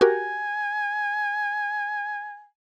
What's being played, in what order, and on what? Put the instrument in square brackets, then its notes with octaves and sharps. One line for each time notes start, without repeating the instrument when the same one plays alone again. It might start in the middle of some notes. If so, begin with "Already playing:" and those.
[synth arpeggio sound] F#4 G4 A#4 [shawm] G#5